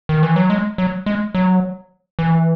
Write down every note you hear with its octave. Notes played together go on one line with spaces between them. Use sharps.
D#3
E3
F#3
G#3
F#3
G#3
F#3
E3